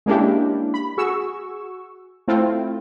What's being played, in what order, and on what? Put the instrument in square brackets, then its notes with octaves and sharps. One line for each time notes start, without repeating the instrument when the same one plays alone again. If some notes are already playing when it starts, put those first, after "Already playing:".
[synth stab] G#3 A#3 C#4 D4 E4 G4
B5
F#4 G#4 C#6 E6
A3 C4 E4 F4